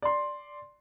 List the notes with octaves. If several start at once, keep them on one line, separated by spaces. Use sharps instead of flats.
D5 C6